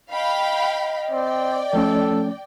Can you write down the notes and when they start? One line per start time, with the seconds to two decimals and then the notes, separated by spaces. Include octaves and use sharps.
0.11 D#5 F5 G5 B5
1.11 C4 D5 G5
1.73 F3 A3 C#4 A4